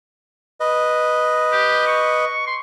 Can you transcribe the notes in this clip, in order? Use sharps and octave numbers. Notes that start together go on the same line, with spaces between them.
B4 D#5
G4
C#6
C6